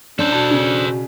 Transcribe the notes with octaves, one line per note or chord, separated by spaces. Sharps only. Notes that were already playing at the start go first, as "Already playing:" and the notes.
C#4 D4 A4 C5
B2 A5
C#3 C#4